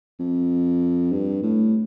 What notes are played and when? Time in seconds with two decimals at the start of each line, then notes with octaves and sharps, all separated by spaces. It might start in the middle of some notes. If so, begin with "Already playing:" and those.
0.19 F2
1.12 G2
1.43 A2